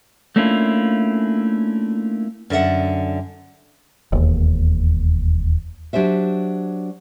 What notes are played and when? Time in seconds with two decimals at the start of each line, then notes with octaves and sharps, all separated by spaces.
0.36 A3 A#3 C#4 D4 E4 F4
2.50 F#2 D3 F4 E5 F#5
4.12 E1 D#2
5.93 F#3 D4 G4 C5 E5